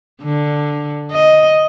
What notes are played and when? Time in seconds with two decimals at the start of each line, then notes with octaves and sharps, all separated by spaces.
0.23 D3
1.12 D#5